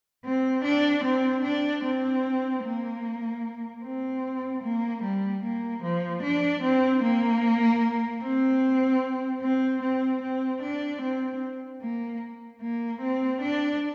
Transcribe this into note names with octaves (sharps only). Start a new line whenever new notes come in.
C4
D4
C4
D4
C4
A#3
C4
A#3
G3
A#3
F3
D4
C4
A#3
C4
C4
C4
C4
D4
C4
A#3
A#3
C4
D4